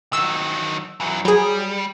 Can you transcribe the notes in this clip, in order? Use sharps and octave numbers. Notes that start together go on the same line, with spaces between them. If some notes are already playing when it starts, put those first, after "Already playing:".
D#3 F#3 E6
E3 F#3
F#3 G3 G#4